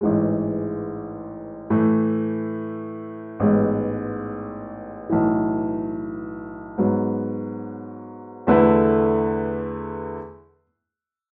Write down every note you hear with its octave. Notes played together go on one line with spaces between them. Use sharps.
A1 G#2 E3 G#3
A2 E3 A3
A1 G#2 G#3 B3
B1 A2 E3
G#2 F#3 B3
E2 D3 A3 E4 B4